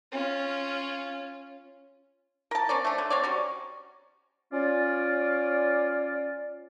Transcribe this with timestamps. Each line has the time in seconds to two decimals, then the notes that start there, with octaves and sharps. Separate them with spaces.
0.12 C#4 F4
2.51 A#4 A5
2.69 C4 C#4 D5
2.85 A3 D4
2.98 D3
3.10 C4 C#5 D5
3.24 F#3 G3 C#4
4.53 C#4 F4 D5